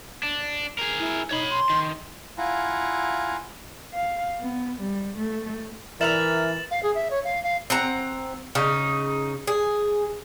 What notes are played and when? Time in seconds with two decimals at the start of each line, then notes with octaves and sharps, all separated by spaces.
0.23 D4
0.79 G#4 A#4
1.00 E4
1.31 D#4 C#5 B5
1.50 C6
1.70 D#3
2.38 E4 F4 F5 F#5 G#5 A#5
3.93 F5
4.41 B3
4.81 G3
5.17 A3
6.01 E3 A#4 E5 F#5 A#5 A6 E7 F#7
6.71 F5
6.83 G#4
6.94 E5
7.11 C#5
7.24 F5
7.43 F5
7.70 C4 F#5 A#5
8.55 C#3 D#4
9.47 G#4